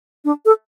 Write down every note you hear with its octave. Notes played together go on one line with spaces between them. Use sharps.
D4
A4